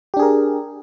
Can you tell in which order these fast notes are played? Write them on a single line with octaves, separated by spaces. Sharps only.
G4 D4 G#4 A#4